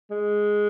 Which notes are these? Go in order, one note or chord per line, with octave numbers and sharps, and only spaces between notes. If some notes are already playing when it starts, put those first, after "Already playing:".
G#3